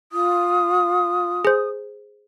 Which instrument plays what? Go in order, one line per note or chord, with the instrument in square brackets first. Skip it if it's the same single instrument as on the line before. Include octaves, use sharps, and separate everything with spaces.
[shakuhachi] F4 [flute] D#6
[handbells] G#4 C5